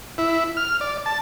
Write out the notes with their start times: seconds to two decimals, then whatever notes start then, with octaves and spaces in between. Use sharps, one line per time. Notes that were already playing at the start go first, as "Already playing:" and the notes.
0.18 E4
0.57 F6
0.81 D5
1.06 A5